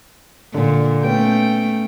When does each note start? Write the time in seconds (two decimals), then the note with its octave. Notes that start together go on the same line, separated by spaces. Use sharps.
0.54 A#2 D3
1.03 A3 B3 C#4 G5